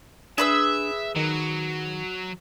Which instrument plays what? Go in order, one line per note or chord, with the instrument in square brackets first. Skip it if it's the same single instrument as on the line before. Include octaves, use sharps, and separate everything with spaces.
[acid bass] D4 [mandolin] G#4 B4 E6 [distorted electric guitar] E5
[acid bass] D#3 [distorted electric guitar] F#3